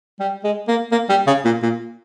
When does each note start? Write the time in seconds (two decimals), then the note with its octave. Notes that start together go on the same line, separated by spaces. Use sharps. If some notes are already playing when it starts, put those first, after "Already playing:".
0.20 G3
0.44 G#3
0.68 A#3
0.91 A#3
1.09 G3
1.27 C#3
1.45 A#2
1.63 A#2